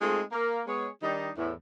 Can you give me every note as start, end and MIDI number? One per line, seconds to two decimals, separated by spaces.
0.01 0.21 56
0.01 0.21 57
0.01 0.21 60
0.01 0.21 63
0.01 0.21 65
0.01 0.21 68
0.32 0.61 58
0.67 0.89 56
0.67 0.89 59
0.67 0.89 68
0.67 0.89 73
1.02 1.29 51
1.02 1.29 55
1.02 1.29 62
1.02 1.29 63
1.37 1.51 40
1.37 1.51 45